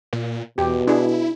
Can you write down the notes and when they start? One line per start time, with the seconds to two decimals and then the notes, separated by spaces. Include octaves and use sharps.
0.13 A#2
0.58 E2 B2 G4
0.87 D4 E4 G#4